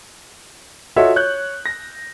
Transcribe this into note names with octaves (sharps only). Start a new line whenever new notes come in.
F4 F#4 A4 C#5 D#5 E5
C#5 F#6 G6
A#6